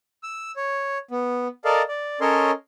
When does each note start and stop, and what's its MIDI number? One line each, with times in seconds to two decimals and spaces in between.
0.23 0.52 88
0.56 0.98 73
1.11 1.48 59
1.65 1.82 69
1.65 1.82 70
1.65 1.82 74
1.65 1.82 75
1.65 1.82 77
1.89 2.19 74
2.21 2.51 61
2.21 2.51 69
2.21 2.51 70
2.21 2.51 73
2.21 2.51 75
2.21 2.51 84